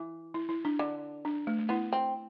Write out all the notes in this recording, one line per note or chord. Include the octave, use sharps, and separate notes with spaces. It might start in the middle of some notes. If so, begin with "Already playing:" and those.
Already playing: E3
E4
E4
D4
D3
D4
A3
A3
B3 E4
C4